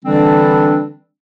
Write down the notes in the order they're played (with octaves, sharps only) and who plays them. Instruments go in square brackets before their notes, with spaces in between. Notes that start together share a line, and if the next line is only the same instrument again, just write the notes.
[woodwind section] D3 E3 G3 C4 D4